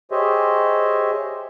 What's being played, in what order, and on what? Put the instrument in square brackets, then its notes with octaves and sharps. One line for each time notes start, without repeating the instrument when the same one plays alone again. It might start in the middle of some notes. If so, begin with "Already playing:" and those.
[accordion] G4 G#4 C5 C#5 D#5 E5